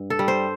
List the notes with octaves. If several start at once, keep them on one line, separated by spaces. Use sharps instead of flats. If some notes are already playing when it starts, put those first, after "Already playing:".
Already playing: G2
A4
G3
C5